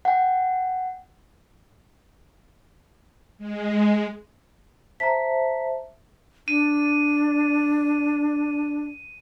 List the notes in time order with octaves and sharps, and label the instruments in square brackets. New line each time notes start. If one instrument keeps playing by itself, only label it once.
[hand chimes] F#5 G5
[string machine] G#3
[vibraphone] C5 E5 A5 [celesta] A#5 B6
[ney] D4 [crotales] D#7